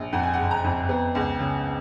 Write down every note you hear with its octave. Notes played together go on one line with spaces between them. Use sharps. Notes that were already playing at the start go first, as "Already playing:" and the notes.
Already playing: A#1
F2 F#5
G#5
F#1 F#5
A#5
F2
B3
C#2
C#3